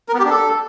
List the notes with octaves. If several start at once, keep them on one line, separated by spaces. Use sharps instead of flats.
A#4
B3
G4
D4
A4